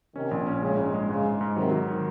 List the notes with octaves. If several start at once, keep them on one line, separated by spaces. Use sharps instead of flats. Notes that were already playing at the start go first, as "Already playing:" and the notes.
C3 D#3 C#4
A#1
C#4
C#3 G#3
G#2
G#3
G#2 C#3
G#2
G#2
C3 D#3 F#3
F#3
D#3